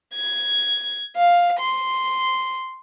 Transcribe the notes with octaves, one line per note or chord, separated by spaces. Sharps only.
G#6
F5
C6